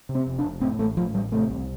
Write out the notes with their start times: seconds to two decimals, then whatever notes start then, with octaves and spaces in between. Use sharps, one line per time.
0.09 C3
0.15 C4
0.27 F1
0.39 D4
0.44 F1
0.61 A2 C4
0.79 A1 A3
0.97 A2 F3
1.14 A1 G3
1.32 C3 A3
1.50 C2